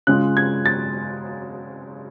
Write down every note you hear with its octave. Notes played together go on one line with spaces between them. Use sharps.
C#3 G#3 C#4 F4 F#6
G#6
A6